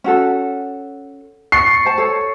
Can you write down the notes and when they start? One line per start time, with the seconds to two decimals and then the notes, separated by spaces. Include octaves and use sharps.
0.04 C#4 F#4 A4
1.52 C#6 A6 C7 C#7
1.85 C5 A5
1.98 A4 C#5